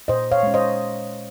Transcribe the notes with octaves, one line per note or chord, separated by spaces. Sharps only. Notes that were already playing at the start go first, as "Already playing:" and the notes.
A#2 C5 D#5
C#5 F5
G#3 C#4
C5 D#5